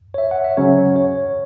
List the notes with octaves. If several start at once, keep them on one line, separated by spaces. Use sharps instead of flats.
C#5
E5
F#5
E5
C#3 F#3 C#4 C#5
C#5